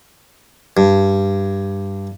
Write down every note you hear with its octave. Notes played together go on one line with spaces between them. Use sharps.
G2